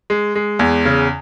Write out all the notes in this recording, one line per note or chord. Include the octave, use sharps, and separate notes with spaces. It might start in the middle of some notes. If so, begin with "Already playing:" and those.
G#3
G#3
E2
C#3